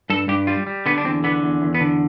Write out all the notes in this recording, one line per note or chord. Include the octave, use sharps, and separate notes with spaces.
G2 A4
G2 G4
G3 F4
G3
D3 B3
D4
E2 C4
D3 B3
E2
E2
B3
D3